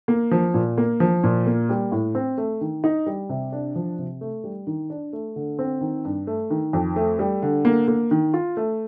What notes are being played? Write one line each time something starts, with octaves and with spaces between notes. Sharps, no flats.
A#3
F3
A#2
A#3
F3
A#2
A#3
G3
A2
C4
A3
D#3
D#4
G3
C3
D4
F3
C3
A3
G3
D#3
D4
A3
D3
C4
D#3
G2
A3
D#3
F2
A3
G3
D3
A#3
A#3
D#3
F4
A3